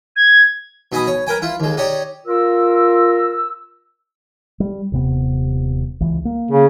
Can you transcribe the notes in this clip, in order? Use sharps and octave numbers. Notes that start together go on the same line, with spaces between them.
G#6
B2 D#4 G#5 B5 D#6
C#5
A#4 B4 G5 G#5
E4 F4
D#2 G#3
D#4 G4 C#5 D5
F4 A#4 E6
G3
D#1 C3 B3
C#2 E3
A#3
C#3